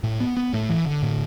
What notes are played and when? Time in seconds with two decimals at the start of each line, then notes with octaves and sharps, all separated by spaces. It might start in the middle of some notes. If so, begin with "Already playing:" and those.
0.03 A2
0.20 B3
0.37 B3
0.53 A2 A3
0.70 E3
0.86 D3
1.03 A2